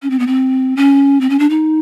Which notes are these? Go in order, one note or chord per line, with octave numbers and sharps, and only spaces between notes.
C#4
C4
B3
C4
C#4
C4
C#4
D4
D#4